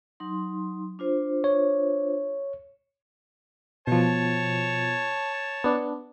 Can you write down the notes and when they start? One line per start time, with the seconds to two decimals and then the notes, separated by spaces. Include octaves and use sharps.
0.20 F#3 D#4 C6
0.99 D4 F4 C5
1.44 C#5
3.87 B2 F3 C#5 A5
5.64 B3 D4